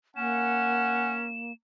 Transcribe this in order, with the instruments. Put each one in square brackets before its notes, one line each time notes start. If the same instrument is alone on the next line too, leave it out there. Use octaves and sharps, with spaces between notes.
[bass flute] A#3 [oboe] C#4 [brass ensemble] F#5 G#5 [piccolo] E7